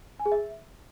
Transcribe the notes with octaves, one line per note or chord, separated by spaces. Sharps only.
G#5
G#4
E5